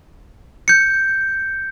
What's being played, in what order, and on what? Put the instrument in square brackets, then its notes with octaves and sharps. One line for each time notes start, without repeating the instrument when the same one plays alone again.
[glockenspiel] G6 C#7